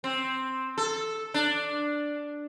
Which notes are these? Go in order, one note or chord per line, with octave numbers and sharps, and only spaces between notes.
C4
A4
D4